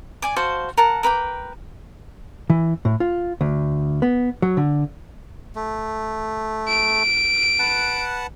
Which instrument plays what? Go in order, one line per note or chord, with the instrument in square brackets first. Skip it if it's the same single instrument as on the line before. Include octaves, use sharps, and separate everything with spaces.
[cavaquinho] D5 G#5 D6
F#4 C5 F5 A5
A#4 F#5 A5
A#4 B4 G5 D6
[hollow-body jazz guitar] E3
A2
F4
D2
B3
F#3
D3
[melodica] A3
[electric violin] D7
[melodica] B4 F#5 A5